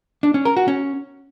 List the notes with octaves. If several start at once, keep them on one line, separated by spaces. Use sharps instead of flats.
D4
C#4
A#4
F#4
C#4